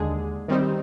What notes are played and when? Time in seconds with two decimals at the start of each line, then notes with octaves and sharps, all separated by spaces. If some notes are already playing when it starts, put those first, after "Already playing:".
Already playing: D#2 D3 G#3 D4 G#4
0.48 D#3 G3 C4 D#4